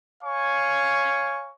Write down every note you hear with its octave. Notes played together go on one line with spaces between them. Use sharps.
C#5 F5 G#5 C#6